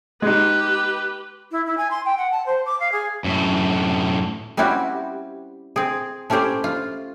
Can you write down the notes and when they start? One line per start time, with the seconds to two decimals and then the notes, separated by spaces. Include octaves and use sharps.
0.22 G#3 D#4 G4 B4
1.51 E4
1.65 E4
1.77 G#5
1.90 C6
2.05 G5
2.17 F#5
2.31 A5
2.46 C5
2.65 D6
2.79 F5
2.92 G#4
3.24 F#2 A2
4.57 G3 C4 C#4 E4 F#4 G4
5.76 C4 G#4
6.30 A3 C#4 E4 G4 C5
6.64 F4